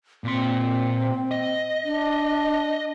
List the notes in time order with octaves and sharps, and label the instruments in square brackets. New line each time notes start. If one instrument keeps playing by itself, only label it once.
[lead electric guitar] A#2 C6 [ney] C4
[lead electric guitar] D#5
[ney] D4